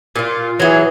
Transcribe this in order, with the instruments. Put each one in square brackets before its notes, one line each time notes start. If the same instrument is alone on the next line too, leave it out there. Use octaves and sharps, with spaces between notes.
[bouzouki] A#2 F4
[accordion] E3 [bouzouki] F#3 G#4